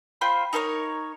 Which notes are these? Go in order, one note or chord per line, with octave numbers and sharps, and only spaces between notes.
F4 C5 G5 B5
D#4 A4 A#4 C#5